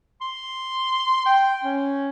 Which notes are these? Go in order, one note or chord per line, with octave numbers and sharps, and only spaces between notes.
C6
G5
C#4